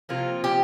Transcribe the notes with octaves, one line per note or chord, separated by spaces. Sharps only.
C3 F3 A#3 F4
G4